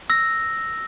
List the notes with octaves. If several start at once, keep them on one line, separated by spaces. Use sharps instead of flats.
E6 A#6